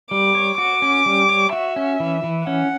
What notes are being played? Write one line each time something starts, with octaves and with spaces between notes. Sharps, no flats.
G3 D6
C#5
F#4 D6
C#4
G3
C#5
F#4 E5
C#4
E3
E3
C#4 F#5